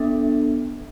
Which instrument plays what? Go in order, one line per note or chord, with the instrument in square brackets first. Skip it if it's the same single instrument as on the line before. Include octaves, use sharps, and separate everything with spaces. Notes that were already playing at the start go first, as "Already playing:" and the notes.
Already playing: [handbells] B3 D4 A4 E5